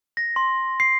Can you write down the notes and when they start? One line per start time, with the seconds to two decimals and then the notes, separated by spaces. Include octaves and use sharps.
0.17 A#6
0.36 C6
0.80 C7